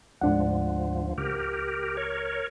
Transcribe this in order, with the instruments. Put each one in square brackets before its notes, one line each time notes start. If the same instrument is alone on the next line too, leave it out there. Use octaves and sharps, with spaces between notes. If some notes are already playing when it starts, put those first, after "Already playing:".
[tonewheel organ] D2 F3 [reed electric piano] G#2 D4 F#5
[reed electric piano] C#2 [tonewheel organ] G4 A#4
[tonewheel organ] A#4 C#5